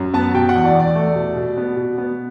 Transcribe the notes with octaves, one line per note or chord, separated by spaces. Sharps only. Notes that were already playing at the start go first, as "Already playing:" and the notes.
Already playing: F#2
B3 A5
B2 G5
F#5
E2
D5
E2
D5
A3
B2
B2
B3
B2
B3